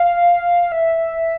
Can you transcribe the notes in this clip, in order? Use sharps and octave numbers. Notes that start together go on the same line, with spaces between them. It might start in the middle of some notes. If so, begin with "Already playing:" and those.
Already playing: F5
E5